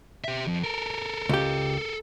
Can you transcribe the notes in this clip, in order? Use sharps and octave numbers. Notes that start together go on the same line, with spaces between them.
G4 E5
F2
A4 A#4
C#2 G4